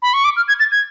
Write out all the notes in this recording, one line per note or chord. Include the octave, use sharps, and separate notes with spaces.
B5
C#6
D6
F6
G#6
A6
G#6